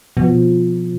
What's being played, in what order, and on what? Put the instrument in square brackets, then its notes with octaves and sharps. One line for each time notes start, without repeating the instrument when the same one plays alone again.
[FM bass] B2 [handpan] F3